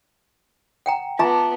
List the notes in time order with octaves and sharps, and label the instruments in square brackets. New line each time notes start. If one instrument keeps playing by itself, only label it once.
[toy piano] F#5 G5 A#5
[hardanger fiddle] B3 [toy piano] F4 E5 A#5 [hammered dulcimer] A5 D6